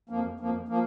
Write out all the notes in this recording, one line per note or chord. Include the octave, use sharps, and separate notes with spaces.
F2 F3 A#3
F2 F3 A#3
F3 A#3